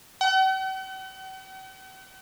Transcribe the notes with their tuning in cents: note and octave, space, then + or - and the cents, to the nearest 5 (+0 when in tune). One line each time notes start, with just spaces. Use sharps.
F#5 +45